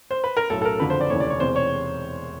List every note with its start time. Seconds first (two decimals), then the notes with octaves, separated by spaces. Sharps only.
0.11 C5
0.24 B4
0.37 A#4
0.50 B1 A2 F#3 A4
0.62 A4
0.65 A#4
0.80 F#1 F2 D3 F3 B4
0.90 C5
1.01 D5
1.10 F1 D#2 C#3 E3 C#5
1.20 D5
1.30 C#5
1.40 E1 E2 C3 E3 C5
1.56 C#5